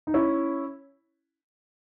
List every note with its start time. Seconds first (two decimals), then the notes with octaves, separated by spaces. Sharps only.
0.07 D#4
0.14 C#4 E4